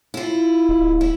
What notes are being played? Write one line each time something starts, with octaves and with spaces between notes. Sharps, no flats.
E4 F4
D1
E4